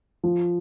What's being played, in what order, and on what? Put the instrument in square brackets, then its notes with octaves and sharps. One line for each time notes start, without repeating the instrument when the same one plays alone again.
[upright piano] F3